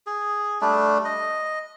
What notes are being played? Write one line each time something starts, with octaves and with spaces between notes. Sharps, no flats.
G#4
G3 A3 D4
D#5